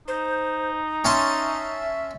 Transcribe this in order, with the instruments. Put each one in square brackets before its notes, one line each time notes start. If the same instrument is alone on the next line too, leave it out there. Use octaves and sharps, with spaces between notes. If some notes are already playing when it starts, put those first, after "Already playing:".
[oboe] D#4 [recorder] C5
[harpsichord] C#4 A5 C6 [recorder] E5